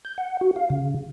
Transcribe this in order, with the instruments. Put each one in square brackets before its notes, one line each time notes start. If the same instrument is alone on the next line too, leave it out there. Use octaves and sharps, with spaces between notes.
[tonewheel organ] G6
F#5
F#4
F5
C#3